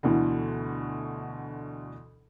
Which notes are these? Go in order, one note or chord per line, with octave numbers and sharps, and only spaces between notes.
D2 B2 D3 E3